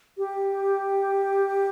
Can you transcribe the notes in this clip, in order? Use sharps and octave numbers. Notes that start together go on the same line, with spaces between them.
G4